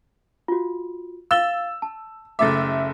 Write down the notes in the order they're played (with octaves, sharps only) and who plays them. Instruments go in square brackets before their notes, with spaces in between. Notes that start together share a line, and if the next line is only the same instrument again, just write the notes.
[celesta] F4 F#4
[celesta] F5 A6 G7 [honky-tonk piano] E6
[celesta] A5
[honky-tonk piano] F#1 A3 E5 [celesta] D6 A6